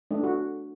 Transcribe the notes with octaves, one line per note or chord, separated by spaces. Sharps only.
A3 D4
F#4